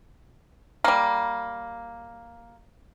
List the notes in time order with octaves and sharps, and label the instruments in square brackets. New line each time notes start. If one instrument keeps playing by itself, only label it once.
[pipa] G3 A#3